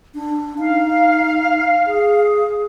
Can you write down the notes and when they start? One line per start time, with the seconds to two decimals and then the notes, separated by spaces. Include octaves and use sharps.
0.15 D4
0.58 D#4 F5
1.87 G#4